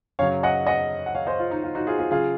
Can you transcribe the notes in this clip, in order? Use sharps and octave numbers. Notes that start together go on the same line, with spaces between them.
F#2 C#3 F#3 C#5 F5
D#5 F#5
D#5 F#5
F#5
C#5 F5
C5 D#5
F4
D#4
F4
D#4 F#4
F4 G#4
F4 G#4
C#3 F#3 F4 G#4